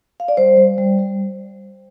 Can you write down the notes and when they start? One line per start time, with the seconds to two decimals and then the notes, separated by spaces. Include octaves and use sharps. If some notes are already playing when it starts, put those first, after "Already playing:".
0.20 F5
0.28 D5
0.37 G3 C5
0.57 G3
0.78 G3
0.99 G3